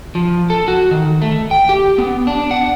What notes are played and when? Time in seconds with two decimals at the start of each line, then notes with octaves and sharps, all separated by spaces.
0.15 F3
0.50 A4
0.68 F#4
0.91 D#3
1.22 A3
1.51 G5
1.69 G4
1.98 B3
2.27 D4
2.51 F#5